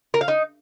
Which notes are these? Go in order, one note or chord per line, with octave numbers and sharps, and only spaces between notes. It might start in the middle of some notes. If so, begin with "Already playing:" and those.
A#4
F5
D#4